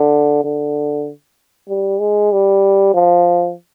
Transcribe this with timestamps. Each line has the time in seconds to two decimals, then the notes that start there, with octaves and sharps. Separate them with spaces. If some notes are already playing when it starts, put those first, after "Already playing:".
Already playing: D3
0.44 D3
1.69 G3
2.00 G#3
2.32 G3
2.94 F3